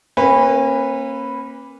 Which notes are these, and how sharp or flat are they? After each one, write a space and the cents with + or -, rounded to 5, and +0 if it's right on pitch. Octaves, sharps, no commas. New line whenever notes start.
A#3 +0 C#4 -40 B4 +0